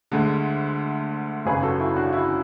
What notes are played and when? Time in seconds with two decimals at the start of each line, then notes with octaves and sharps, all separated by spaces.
0.12 D2 D3 G#3
1.45 G#1 F#2 C#3 G#4 B4
1.63 F#4 A4
1.80 E4
1.96 D4 F#4
2.13 E4